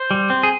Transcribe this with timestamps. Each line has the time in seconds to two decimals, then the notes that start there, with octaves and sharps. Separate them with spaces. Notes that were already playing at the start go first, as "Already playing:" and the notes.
Already playing: C5
0.11 G3
0.30 C4
0.43 G#4